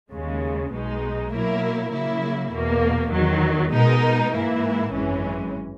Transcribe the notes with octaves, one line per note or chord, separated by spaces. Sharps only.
D#2 C#3 G#3
B1 B2 G#3 D#4
B2 F#3 A#3 E4 A#4
C#3 F#3 A#3 E4
E2 B2 A#3
E2 D#3 F#3
B2 G#3 B3 D#4 A#4
G#2 E3 A#3 E4
G#1 F#2 E3 G#3 C#4